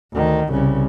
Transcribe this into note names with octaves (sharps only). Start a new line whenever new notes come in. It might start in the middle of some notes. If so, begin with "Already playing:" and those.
D2 D#3
C2 C#3